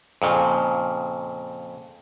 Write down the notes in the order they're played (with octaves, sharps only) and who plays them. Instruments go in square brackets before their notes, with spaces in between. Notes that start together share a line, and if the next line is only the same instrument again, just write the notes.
[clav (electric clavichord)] F2 A#2 C#3